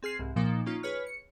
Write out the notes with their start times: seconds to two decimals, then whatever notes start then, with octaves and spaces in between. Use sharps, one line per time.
0.03 C4 G#4 F6 C7
0.19 C2 G#2
0.36 A#2 F3 A#3 D#4
0.66 A#3 C#4 D#4 F4
0.83 G#4 B4 C#5 F6
1.07 C#7